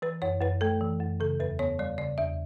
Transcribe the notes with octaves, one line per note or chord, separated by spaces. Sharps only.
E3 B4
F#2 C#5
F#2 B4
A3 A4
E3
F#2
C#3 A4
E2 B4
B3 C#5
G3 D5
C#3 D5
E2 E5